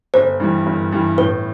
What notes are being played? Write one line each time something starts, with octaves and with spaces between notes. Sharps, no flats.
G1 C5
G2 E3 G3
G1
G2 E3 G3
A2 B4